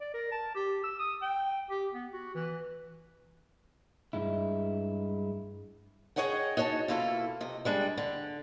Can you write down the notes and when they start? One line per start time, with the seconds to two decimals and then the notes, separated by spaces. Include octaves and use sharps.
0.01 D5
0.14 A#4
0.32 A5
0.55 G4
0.84 E6
0.99 D#6
1.22 G5
1.70 G4
1.94 B3
2.13 F#4
2.35 E3
4.13 G2 G#3 E4
6.16 G#4 C#5 D#5 F#5 G5
6.57 D#4 F#4 C#5 G#5 A5
6.88 B2 A#3 E4 F4 A4
7.41 C3 D#5
7.65 G3 G#3 D4
7.97 D3